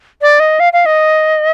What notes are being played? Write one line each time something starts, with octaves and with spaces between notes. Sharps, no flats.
D5
D#5
F5
F5
D#5